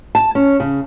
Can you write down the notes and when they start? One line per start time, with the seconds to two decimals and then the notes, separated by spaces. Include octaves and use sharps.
0.15 A5
0.35 C#4
0.60 C#3